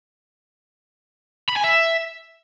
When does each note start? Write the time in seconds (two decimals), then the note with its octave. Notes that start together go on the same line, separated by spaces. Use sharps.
1.49 B5
1.57 G#5
1.64 E5